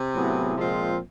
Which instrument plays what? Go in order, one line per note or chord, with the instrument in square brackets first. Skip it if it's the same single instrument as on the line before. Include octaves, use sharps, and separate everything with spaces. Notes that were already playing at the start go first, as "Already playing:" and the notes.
Already playing: [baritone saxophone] C3
[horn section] A2 F#3 B3 E4 G#4
A#2 F3 G#3 C4 F4